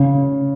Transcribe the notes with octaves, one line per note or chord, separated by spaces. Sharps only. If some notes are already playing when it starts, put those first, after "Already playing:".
Already playing: C#3